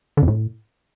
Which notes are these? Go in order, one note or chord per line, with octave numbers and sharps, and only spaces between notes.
D3
F2
A2